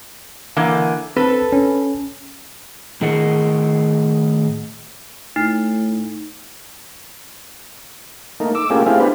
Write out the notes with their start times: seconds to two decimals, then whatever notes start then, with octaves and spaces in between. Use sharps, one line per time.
0.57 D3 E3 A#3
1.16 C4 A4 B4
1.52 C#4
3.01 A2 D#3 G#4 A#4 D#5 F#5
5.36 A2 D#4
8.40 A3 A#3 D#4
8.55 D6 E6
8.70 A3 A#3 C#4 F4 G4 G#4
8.86 A3 C4 E4 G4 G#4 F5
9.00 B3 D4 E4 G4 B4 C5